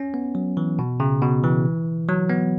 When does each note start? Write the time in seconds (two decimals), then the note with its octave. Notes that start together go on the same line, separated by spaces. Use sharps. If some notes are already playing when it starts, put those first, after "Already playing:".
Already playing: C#4
0.14 B3
0.35 F#3
0.57 E3
0.79 B2
1.00 C#3
1.22 B2
1.44 E3
2.08 F#3
2.30 B3